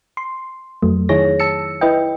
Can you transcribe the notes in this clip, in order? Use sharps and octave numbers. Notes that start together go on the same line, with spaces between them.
C6
F2 F#3 A3
D#3 D#4 E4 G#4 C#5 A#6
A5 E6 C#7
E4 B4 D#5 G5